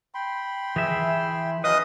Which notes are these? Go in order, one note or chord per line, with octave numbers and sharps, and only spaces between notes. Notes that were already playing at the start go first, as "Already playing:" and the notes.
G5 B5 C6
E3 G#4 E5
F#3 C#4 B4 D#5 F5 D#6